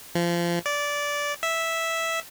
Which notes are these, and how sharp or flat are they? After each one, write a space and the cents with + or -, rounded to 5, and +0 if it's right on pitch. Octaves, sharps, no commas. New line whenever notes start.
F3 -25
D5 -15
E5 -5